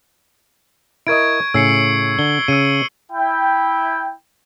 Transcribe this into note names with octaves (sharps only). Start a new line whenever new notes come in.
E4 A#4 D#5 C#6 G#6 D7
A2 C#3 G#5 E6 C7 C#7
D3 G7
C#3 E6 C#7 D#7
E4 G5